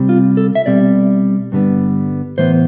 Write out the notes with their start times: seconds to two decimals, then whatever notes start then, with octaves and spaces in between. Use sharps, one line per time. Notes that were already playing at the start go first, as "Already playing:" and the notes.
Already playing: C3 G3 C4
0.09 F4
0.37 A4
0.55 E5
0.66 B2 G3 C4 D5
1.52 G2 D3 G3 B3
2.38 A2 E3 B3 C5